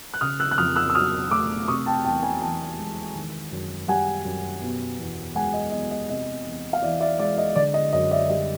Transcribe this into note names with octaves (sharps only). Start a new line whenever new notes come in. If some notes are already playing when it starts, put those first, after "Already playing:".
F#6
C#3 D#6 F6
E6 F#6
F#6
F2 D#6 F6
E6 F#6
E6
F#3 D#6 F6
A3 D6 E6
C3 C#6 D#6
G5 A5
E2 G5 A5
G#5 A#5
E3 G5 A5
G#3
D#3
F#2
G3 F#5 G#5
F#2
B2
E2
G#3 F#5 G#5
D#5
E2 D#5
D#5
C3 D#5
E2
F5
E3 D5 E5
D5 E5
G#3 D5 E5
D#5
D3 D5
D#5
F#2 D#5
D5 E5
G3 D#5